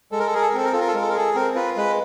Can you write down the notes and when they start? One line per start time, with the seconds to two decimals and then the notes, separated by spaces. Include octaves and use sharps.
0.12 G#3 A4
0.20 A#4
0.27 A4
0.33 G#4 A#4
0.42 A4
0.49 A#4
0.53 C4 A4
0.65 A#4
0.72 F4 A4
0.80 A#4
0.88 A4
0.94 G#3 A#4
1.02 A4
1.10 A#4
1.14 G#4 A4
1.35 C4 A#4
1.55 F4 B4
1.77 G#3 B4